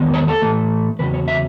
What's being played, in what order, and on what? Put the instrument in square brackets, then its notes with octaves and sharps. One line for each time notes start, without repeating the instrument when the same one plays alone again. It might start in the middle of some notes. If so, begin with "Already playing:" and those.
Already playing: [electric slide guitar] E2 D#3 G#3 B3
C#5
A4
A2 E3 A3
E2 C#3 F#3 C#4 B4
C#5
E5